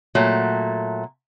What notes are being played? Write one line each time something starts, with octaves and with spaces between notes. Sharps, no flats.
A#2 F#3 A3